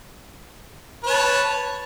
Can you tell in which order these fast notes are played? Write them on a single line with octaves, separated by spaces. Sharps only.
B4 C#5 A5